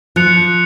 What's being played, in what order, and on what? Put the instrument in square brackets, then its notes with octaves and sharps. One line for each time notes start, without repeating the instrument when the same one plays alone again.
[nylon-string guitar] F3 [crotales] F#6 C#7 F7